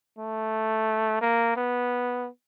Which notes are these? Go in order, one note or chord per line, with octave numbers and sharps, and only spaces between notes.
A3
A#3
B3